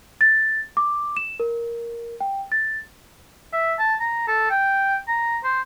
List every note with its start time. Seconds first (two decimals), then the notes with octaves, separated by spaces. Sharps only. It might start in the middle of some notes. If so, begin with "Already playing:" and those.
0.21 A6
0.77 D6
1.17 E7
1.40 A#4
2.21 G5
2.52 A6
3.53 E5
3.79 A5
4.00 A#5
4.27 A4
4.50 G5
5.08 A#5
5.44 C5